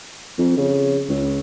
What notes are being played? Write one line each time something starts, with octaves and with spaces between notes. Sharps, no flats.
F2
C#3
C#2